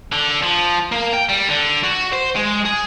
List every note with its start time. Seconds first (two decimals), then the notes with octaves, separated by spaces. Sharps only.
0.12 D3
0.42 F3
0.92 A#3
1.13 G5
1.29 G3
1.48 D3
1.83 F#4
2.12 C5
2.36 G#3
2.65 G#4